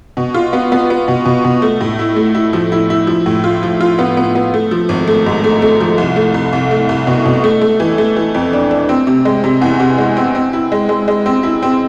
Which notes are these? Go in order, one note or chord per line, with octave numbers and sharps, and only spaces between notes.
B2
F4
B3
B3
B3
B2
B2
B2
A3
A2
E4
A3
E4
F3
E4
E4
F3
A2
F4
F3
F4
B3
B3
B3
A3
F3
G#1
A3
G#2
A3
A3
F3
C2
A3
C2
C2
A3
C2
B2
B2
A3
A3
E3
A3
E3
F2
D4
D4
C4
C3
G#3
C3
E2
C3
G#3
C4
C4
E4
G#3
G#3
G#3
C4
E4
C4